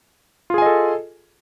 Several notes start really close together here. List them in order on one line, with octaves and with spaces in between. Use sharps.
F4 G#4 G#5 D#5 A4